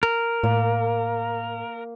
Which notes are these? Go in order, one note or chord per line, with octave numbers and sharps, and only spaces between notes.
A#4
A2 A#3